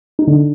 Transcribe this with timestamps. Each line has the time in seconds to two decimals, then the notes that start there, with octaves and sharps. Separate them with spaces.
0.19 D#4
0.27 D3 D4